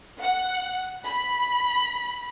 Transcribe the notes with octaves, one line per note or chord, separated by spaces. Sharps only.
F#5
B5